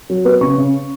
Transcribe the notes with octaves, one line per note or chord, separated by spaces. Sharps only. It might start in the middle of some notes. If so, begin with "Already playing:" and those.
F#3
B3
C#3 C#6
C#3